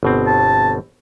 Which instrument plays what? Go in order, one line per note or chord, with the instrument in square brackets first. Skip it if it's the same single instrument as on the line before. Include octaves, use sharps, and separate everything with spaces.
[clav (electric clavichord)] G1 B2 C4
[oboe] A5